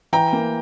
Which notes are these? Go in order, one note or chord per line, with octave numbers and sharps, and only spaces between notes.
E3 G5 A#5
A#3